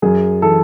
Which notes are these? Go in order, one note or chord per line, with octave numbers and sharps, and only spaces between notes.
F#2 G#4
E3 A4